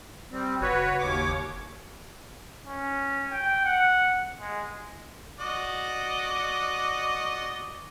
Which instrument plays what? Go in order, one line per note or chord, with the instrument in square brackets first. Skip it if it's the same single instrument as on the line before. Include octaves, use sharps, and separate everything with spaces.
[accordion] G3 C4
[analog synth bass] F#1 [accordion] F#4 B4 C#5
[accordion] D#2 C#5 D6
[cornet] C#4
G5
F#5
G#3
[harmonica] F#4 D5 D#5